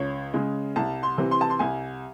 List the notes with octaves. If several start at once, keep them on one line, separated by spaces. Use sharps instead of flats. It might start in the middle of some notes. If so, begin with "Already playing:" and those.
Already playing: C#2 C#5
C#3 G#3
C2 A5
C6
C3 E3
C6
A5
C6
C2 G#5